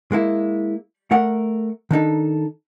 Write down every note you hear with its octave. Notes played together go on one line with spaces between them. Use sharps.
G#3 A#3 E4
A3 A#4 F#5
D#3 D4 D#4 A4